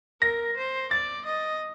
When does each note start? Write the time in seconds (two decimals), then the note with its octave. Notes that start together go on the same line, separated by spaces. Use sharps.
0.21 A#4 A#6
0.57 C5
0.91 D5 A6
1.26 D#5